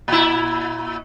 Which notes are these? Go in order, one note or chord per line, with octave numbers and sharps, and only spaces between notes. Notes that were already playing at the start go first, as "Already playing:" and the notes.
A#2 E4